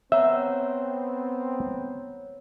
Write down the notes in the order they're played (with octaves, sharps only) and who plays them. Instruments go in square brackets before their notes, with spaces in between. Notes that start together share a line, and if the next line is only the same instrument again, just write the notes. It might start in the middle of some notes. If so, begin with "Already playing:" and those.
[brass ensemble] B3 C4 [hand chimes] C#5 F#5 A#5 [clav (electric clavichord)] E5